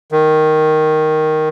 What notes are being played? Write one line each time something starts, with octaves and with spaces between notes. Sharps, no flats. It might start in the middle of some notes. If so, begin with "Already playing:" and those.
D#3